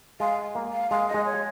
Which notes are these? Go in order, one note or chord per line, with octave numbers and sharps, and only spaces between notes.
G#3 F5
A#3
F5
G#3 F5
D#5
G#3
C#5